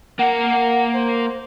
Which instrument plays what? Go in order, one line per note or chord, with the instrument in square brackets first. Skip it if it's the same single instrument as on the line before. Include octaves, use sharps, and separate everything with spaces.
[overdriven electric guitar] A#3 A#4 [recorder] F#5
[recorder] C5